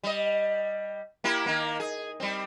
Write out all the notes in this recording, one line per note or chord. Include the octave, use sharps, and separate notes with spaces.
G3 D#5
A#3 E4 G4
D#3 A#3
G#4
G3 C4